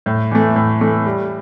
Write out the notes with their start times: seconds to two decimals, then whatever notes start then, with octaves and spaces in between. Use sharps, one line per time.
0.06 A2
0.31 E3 A3
0.56 A2
0.81 E3 A3
1.06 G3